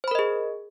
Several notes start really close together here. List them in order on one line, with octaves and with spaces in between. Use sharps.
C5 B5 A#4 D#5 G#4